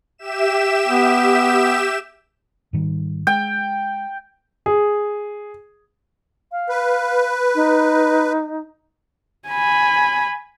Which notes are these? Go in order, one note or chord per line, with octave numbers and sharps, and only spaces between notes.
G4 E5 E7
B3
G#2 D#3 G3
G#3 G5
G#4
F5
B4
D#4
G#5 B5